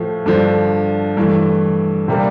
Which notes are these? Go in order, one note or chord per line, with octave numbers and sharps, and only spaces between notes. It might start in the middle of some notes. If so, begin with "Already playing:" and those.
Already playing: A2 F3 A3
G2 D3 F3
G2 E3 A3
C3 G3 A#3 D4